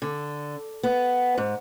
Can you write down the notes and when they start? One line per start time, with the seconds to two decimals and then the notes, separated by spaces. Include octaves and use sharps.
0.02 D3
0.83 B3
1.38 G#2